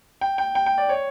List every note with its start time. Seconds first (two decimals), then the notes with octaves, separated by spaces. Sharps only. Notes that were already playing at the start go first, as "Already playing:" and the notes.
0.21 G5
0.38 G5
0.55 G5
0.66 G5
0.78 D5
0.89 C#5